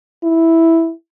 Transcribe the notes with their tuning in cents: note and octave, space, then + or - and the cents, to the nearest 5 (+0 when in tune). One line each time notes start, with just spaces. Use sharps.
E4 -5